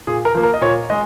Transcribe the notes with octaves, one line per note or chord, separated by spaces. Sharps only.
A#2 G#4
A#4
F3 A#3
A#4
D#5
A#2 C#5
G#3 D#5